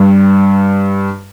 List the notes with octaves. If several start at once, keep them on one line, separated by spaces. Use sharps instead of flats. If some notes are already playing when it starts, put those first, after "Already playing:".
Already playing: G2